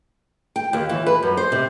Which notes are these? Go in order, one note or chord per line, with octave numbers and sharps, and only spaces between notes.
G5
D#2
E3
B4
F#2
C5
C3